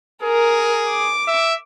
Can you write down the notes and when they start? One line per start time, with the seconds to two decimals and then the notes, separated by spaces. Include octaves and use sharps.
0.23 G#4 A#4
0.89 D6
1.28 E5